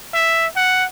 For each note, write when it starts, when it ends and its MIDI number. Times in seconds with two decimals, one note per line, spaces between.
0.13 0.47 76
0.56 0.85 78